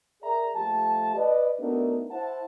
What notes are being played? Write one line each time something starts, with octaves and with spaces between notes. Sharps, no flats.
G#4 A#4 D5 E5 A#5
F3 A3 G4 A5
B4 D5 D#5
A3 B3 D4 D#4 F#4 A#4
E4 C5 F#5 A5